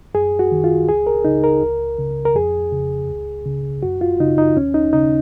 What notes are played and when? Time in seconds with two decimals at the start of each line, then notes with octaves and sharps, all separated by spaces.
0.14 F#2 G#4
0.39 F#4
0.52 D#3
0.64 F4
0.88 C#2 G#4
1.07 A#4
1.25 C#3 D#4
1.44 A#4
1.62 C#2
1.99 C#3
2.25 A#4
2.35 F2 G#4
2.72 C#3
3.09 C#2
3.45 C#3
3.83 F#2 F#4
4.01 F4
4.20 C#3 D#4
4.38 D#4
4.56 D#2 C#4
4.74 D#4
4.93 C#3 D#4